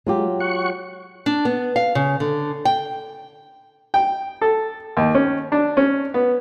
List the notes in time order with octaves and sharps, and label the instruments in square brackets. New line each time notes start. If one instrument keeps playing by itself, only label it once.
[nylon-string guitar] F#3 F4 G4 [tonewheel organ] G#3
[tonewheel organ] F#5 C#6
[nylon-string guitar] D4
B3
F5
C#3
D3
G5
[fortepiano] G5
A4
D#2
C#4
D4
C#4
B3